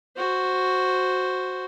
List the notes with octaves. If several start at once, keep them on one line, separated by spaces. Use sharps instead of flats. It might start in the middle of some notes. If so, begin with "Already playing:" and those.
F#4 C5